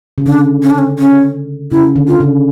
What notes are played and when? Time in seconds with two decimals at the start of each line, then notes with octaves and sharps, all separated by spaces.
0.18 C#3
0.26 D3 D4
0.63 C#4
0.70 D4
0.78 C#4
0.99 C#4
1.71 C#3 E4
1.96 D3
2.08 F4
2.20 C#3